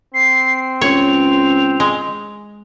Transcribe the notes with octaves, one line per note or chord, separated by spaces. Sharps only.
C4 C7
C#2 C#5 F7
G#3